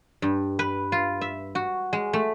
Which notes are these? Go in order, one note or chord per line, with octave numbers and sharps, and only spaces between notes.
G2
B4
F4
E5
F#4
G#3
A3